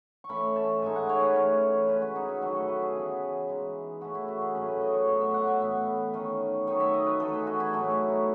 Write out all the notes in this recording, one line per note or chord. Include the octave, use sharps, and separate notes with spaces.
C#6
E3 A3 C#4 B5
A5
A2 G#3 D#4 G#5
F#5
C#5
B4
E3 A3 C#4
C#3 G#3 C#4 B4
F#4
D#4
E4
D#3 F#3 A3 F#4
A4
B4
G#4
C#3 E3 B3
E3 G#3 D#4
C#3 E3 A3 F#4
E4
F#4
G#4
A2 F#3 A3 C#4 B4
B4
D#5
C#5
A2 F#3 B3
E5
F#5
E5
A2 E3 B3
D#3 A3 C#4
D#3 F#3 A3 D#4 C#5
E5
D#5
B4
E3 A3 D#4 A4
G#4
F#4
E4
A2 F#3 A3 D#4
E4
D#4